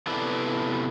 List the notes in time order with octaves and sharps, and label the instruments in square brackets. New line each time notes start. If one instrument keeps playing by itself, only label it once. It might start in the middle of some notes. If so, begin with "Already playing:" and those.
[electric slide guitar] C3 B3 E4 A4 B4 D5